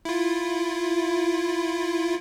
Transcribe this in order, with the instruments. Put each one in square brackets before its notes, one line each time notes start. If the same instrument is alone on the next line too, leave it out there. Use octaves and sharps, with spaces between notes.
[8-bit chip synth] E4 F4